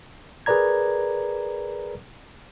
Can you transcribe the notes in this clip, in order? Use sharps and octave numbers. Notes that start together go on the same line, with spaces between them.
G#4 A#4 B4 D5 A#5 G#6